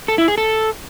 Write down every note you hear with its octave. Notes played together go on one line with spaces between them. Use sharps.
A4
E4
G#4
A4